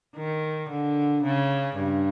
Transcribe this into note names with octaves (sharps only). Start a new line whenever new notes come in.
D#3
D3
C#3
G2